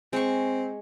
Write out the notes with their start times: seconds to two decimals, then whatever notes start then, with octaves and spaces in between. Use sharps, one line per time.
0.13 G#3 C4 C#6